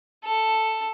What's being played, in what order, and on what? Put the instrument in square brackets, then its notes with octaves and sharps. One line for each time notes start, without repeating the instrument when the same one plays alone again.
[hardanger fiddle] A4